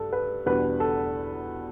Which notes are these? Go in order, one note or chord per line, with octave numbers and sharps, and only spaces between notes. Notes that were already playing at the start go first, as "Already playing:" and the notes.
Already playing: G2 A4
B4
E2 B2 G3 D4 B4
A4